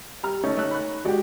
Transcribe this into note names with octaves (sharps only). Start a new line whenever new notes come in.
G3 A#5 F6
A3 C#4 D#4 C#5
A3 E6 F#6
B5 C#6 F#6
G#3 F#4 G4 D5